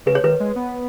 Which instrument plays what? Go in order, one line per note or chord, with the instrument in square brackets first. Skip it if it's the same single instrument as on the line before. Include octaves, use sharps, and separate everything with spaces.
[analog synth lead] C#3 [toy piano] B4
[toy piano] C#5
[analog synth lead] D#3 [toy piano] B4
[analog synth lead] G#3
B3